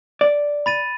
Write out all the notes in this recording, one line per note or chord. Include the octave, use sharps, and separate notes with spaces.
D5
B5 A6 D#7